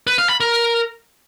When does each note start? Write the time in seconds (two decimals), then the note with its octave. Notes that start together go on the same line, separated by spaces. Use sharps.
0.07 B4
0.18 F5
0.29 B5
0.40 A#4